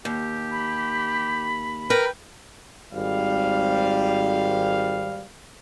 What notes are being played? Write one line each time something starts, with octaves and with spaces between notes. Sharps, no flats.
D#2 G4
B5
A#4 B4 G5
G#1 G3 F5